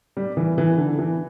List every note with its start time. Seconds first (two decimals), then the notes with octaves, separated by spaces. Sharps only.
0.17 G3
0.37 E3
0.58 E3
0.78 D3
0.99 E3